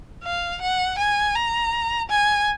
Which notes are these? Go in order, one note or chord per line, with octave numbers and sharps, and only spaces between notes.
F5
F#5
G#5
A#5
G#5